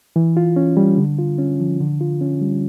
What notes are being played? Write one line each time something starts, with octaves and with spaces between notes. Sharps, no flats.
E3
F4
C#4
G3
D3
F4
C#4
F3
D3
F4
C#4
G3